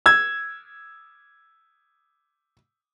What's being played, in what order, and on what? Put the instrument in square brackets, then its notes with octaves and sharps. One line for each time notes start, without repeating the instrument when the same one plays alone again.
[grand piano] E6 G#6